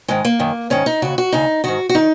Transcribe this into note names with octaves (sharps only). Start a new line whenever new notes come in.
G#2 D#3 G#3
A#3
F#2 D#3
G#2 D#3 C#4
D#4
D#2 C#3 F#4
F#4
D#2 C#3 D#4
G#2 D#3 F#4
F#4
D#3 D#4